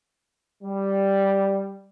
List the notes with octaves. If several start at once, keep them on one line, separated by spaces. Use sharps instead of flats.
G3